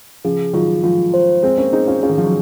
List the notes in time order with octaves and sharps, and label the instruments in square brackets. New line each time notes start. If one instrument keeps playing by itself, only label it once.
[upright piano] C#3 F3 [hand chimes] G#4
[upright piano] D#3 F#3 [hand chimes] F4
[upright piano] F3 G#3 [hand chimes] F4
[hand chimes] C5
[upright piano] G#3 C4 [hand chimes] C5
[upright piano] A#3 C#4
[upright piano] C4 D#4 [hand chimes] G#4
[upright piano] C#4 F4
[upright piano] C#4 F4 [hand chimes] G#4
[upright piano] D#3
F3
F#3